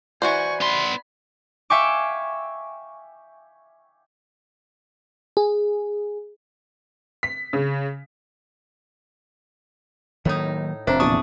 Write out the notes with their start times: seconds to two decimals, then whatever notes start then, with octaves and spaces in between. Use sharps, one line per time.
0.22 E3 F#4 C5 D5 G#5 C#6
0.61 B3 B5 C6
1.70 E5 F5 G5 G#5 C#6 D6
5.37 G#4
7.23 B6
7.53 C#3
10.25 A2 D#3 F#3 A#3 D#4
10.87 F1 C4 D4 C5 E5 A#5
11.00 A#1 E2 D5 A5 C#6 D#6